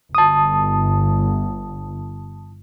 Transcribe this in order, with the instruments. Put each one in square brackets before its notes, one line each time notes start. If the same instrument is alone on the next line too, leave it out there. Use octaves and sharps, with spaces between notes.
[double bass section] G1 [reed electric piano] A5 D#6